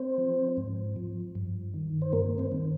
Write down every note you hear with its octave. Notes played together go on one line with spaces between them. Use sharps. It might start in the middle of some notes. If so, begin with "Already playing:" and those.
Already playing: C4 C5
F3
G#2
F3
G2
D#3
C5
G2 A#3 A#4
C4 C5
D#3